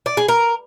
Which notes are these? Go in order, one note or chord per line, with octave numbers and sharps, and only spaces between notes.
D5
G#4
A#4